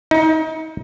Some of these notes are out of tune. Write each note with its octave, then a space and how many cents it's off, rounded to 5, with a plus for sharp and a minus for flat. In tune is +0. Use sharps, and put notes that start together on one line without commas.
D#4 +30